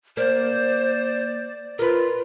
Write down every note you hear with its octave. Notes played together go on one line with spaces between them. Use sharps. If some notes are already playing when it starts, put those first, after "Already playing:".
A#3 C5 D5
F4 A#4 B4